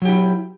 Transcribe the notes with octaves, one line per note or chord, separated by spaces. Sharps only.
F#3 E4 G4